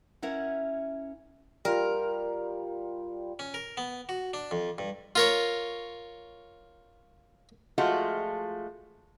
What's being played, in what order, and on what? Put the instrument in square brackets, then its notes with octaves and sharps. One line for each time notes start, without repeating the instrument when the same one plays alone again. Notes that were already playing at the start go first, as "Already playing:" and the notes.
[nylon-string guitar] C#4 E4 A#4 F#5
[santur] G3 F4 [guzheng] A#4
[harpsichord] C#4
A#4
B3
F#4
D4
F2
G2
F4 A#4 C#5
[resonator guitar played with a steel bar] F3 G#3 A3 F4 F#4